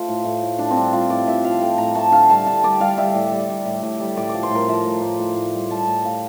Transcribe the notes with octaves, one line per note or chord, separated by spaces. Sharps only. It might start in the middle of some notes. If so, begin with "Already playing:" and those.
Already playing: A3 F4 C5
A2
A2
A2
A2 D4
C4
G3 D4
G3 F4
A2 D5
A2 E5
F3 F5
A3 G5
A2 A#5
A3 A5
D3 F5
G3 A5
D3 A5
G3 D5
G3 F5
G3 E5
A2
G3
G3
A2
A2
G3
A2 D5
F3 D5
C5
A2 A#4
F3 E5
A2
A2
A2
A2
G3
G3 A5
A2
A2 F5